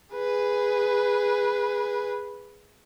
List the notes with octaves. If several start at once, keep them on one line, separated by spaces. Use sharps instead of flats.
G#4 B4